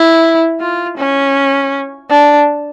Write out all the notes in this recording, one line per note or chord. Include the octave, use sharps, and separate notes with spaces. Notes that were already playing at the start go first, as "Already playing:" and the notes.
Already playing: E4
F4
C#4
D4